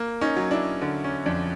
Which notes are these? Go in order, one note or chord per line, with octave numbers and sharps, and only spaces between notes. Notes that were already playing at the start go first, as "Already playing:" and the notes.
Already playing: A#3
C#4 D#4
F#3
D4 E4
D3
C#4
F2 D4